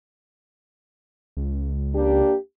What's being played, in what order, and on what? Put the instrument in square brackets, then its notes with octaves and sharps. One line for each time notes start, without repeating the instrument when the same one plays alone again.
[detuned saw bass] C#2
[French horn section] A#3 D4 G4